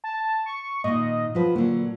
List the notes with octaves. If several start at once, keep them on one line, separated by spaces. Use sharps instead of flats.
A5
C#6
A#2 D#3 D#5
F3 F#3 B4
A#2 D3 F#3